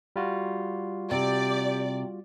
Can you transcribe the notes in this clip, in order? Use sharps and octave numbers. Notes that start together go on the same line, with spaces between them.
G3 F4 F#4
C3 G4 D5